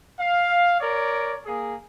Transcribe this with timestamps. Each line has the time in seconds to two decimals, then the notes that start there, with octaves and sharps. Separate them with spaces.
0.18 F5
0.79 A#4 C#5 D5
1.46 A#3 G#4